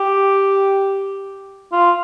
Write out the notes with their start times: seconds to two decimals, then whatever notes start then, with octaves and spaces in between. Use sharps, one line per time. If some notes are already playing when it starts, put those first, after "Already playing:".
Already playing: G4
1.72 F4